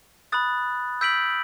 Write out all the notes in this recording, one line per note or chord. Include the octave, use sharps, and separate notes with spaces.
B5 D#6 F#6 A6
E6 G6 B6 D7 F#7